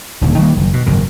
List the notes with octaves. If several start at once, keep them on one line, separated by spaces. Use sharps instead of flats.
D#1 D#2 D3
D#3 G3 A#3
F#1
B2
F#1 G#2 D#3